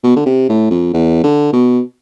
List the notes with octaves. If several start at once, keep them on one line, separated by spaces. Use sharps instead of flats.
B2
D3
C3
A2
F2
E2
D3
B2